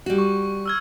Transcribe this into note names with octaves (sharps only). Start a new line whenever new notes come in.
G3 F#4
C#6
E6 F6 G#6